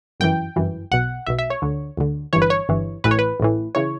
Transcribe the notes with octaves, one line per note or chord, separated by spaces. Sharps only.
G1 F#2 E3 G5
G1 F#2 E3
B1 B2 F#5
B1 B2 E5
E5
C#5
D2 D3
D2 D3
G1 G2 E3 C#5
B4
C#5
G1 G2 E3
A1 A2 E3 B4
C#5
B4
A1 A2 E3
C#3 E3 C#5